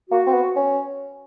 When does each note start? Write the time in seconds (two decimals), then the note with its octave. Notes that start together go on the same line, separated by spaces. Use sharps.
0.10 A#3 F#4
0.26 C4
0.34 B3
0.56 C#4